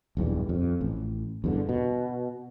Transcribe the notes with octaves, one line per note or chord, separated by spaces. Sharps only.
D#1 B1 E2 G2
F2
A1
E2 G2 D3
B2